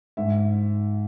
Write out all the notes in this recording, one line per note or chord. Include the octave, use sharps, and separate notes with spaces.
G#2 E5